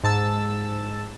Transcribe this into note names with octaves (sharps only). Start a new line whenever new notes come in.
G#2 A5 E6